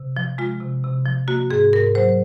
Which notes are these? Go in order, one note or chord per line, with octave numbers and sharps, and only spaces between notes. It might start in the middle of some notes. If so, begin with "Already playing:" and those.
Already playing: C3
F3
G#3 F4
C3
C3
F3
A#3 F#4
G#2 G#4
G#2 A#4
F#3 C5